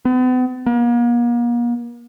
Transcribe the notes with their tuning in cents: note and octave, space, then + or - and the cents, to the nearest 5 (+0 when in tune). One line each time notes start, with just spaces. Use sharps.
B3 +40
A#3 +40